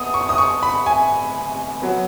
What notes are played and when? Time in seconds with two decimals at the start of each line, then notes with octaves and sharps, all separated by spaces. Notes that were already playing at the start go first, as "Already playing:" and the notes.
Already playing: B3 D#6
0.14 C#6
0.29 D#6
0.38 C#6
0.63 B5
0.86 G#5
1.82 F#3 B3